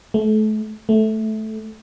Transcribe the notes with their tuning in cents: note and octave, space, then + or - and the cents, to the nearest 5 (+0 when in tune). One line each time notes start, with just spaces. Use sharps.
A3 -35
A3 -10